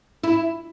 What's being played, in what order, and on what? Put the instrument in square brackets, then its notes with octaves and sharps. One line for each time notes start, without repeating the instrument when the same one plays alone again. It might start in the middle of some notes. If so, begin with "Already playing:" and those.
[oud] E4